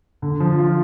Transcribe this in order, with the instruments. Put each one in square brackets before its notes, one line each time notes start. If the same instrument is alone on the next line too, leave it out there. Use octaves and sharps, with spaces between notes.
[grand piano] D3
F3
F4